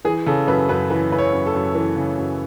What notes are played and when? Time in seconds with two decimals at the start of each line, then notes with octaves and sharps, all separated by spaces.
0.05 E3 G#4
0.26 C#3 A4
0.47 F#2 B4
0.69 F#2 B4
0.90 E3 B4
1.11 C#3 B4
1.18 C#5
1.33 F#2
1.46 A4
1.55 F#2
1.75 E3
1.96 C#3
2.18 F#2